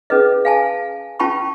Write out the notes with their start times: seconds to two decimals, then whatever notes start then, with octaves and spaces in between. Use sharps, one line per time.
0.10 C#4 G#4 B4 D#5
0.45 F5 G#5 A5
1.19 C#4 F4 G5 A5 B5 C#6